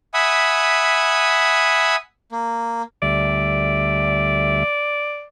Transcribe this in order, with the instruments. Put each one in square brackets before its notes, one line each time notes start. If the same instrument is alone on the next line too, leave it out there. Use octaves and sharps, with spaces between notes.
[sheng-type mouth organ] E5 F#5 G#5 B5 D#6
A#3
[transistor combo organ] D2 G3 E5 [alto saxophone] D5